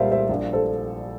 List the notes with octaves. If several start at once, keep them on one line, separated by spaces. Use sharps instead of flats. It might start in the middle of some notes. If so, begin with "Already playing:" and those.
Already playing: C2 A#2 G3 A#4 C5 D5 E5 F5
C5 E5
A#1
A4 C5